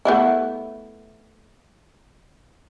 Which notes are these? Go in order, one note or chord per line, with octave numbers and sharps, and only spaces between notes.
A3 B3 E4